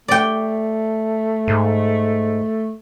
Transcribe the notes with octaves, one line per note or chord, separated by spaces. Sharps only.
A3 D5 G5
G#2